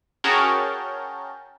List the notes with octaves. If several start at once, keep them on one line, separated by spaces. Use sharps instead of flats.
C#4 F#4 G#4 A#4 G5 A5